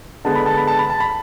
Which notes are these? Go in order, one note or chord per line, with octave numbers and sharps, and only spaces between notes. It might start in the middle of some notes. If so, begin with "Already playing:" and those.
D3 G#3 B3 A5
B5
A5
B5
A5
B5
A5
B5